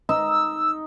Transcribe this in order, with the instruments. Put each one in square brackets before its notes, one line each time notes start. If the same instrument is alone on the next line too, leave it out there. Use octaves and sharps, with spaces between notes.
[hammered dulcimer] D#4 [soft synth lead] E6